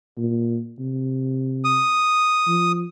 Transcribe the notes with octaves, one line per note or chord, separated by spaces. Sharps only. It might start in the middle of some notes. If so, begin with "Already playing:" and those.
A#2
C3
D#6
F3